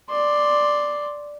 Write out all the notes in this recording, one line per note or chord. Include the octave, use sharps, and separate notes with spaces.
D5 C6